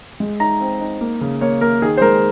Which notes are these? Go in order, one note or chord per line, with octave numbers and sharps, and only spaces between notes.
G#3
D#4 A#5
C4
D#4
A#3
C#3
A#3 C#5
A#3 A#4
D#3 G#4
C5
G#3 A#4